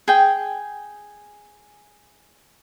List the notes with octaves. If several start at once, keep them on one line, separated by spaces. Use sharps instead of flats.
G#4 G5